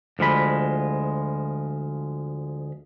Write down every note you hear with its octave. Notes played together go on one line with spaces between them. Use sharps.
D2 F3 G#3 B5